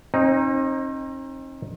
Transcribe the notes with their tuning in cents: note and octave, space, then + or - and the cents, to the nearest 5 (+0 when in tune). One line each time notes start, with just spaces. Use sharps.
C4 +45 D#4 +0